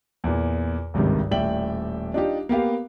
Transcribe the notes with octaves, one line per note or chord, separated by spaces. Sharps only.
E2 A#2
G#1 C#2 G2 C3 D#3
D#1 A2 D5 E5 G5 F#7
D4 D#4 F4 G4
A#3 B3 G4 F5